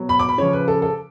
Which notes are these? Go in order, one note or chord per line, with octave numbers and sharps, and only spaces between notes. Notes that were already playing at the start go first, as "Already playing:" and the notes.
Already playing: B2 F#3
B5
D6
B5
C#3 F3 C#5
B4
A4
A4